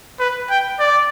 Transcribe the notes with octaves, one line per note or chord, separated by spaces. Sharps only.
B4
G5
D5